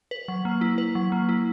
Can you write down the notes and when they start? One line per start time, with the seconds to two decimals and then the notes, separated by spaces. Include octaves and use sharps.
0.11 B4
0.28 F#3
0.45 A#3
0.61 E4
0.78 B4
0.95 F#3
1.12 A#3
1.29 E4